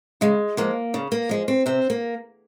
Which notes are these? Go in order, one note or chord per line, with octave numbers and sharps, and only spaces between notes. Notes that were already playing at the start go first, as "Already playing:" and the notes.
C#3 G#3
F3 G#3 A#3
C#3
A#3
F3 G#3
C4
C3 C4
A#3